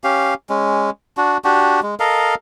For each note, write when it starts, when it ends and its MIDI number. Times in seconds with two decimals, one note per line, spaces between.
0.04 0.34 61
0.04 0.34 67
0.04 0.34 77
0.50 0.90 56
0.50 0.90 61
1.17 1.38 62
1.17 1.38 66
1.44 1.80 62
1.44 1.80 66
1.44 1.80 67
1.83 1.95 56
2.00 2.35 69
2.00 2.35 70
2.00 2.35 75
2.00 2.35 77